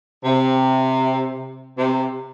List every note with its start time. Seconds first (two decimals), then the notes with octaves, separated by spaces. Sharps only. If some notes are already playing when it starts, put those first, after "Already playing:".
0.25 C3
1.77 C3